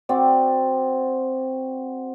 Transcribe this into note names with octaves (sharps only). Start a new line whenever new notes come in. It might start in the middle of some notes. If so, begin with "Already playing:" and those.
C4 F#4 D5